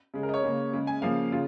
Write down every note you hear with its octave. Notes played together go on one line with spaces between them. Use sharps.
C#3 G#3
A#4
D#5
C#5
C#3 A#3
C#3 G#3
G#5
C#3 F3 A#3 F5
C#3 F4